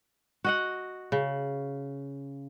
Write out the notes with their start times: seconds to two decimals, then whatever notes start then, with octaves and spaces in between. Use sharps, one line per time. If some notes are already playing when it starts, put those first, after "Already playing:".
0.44 F#4 D#5 F#5
1.12 C#3